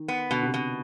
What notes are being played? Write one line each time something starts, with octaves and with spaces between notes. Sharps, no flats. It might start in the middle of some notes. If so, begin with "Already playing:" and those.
Already playing: D#3
B3
B2 D3
C3
B2